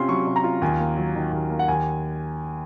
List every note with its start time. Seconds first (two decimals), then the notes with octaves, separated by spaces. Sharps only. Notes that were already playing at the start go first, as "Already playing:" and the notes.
Already playing: C3 C#4 F4 C6
0.09 F#3 C#6
0.27 C3
0.36 A#5
0.44 F4
0.62 D#2 G#5
0.80 A#3
0.97 F#3
1.15 D#3
1.32 D#2
1.50 A#3
1.59 F#5
1.68 D#2 G#5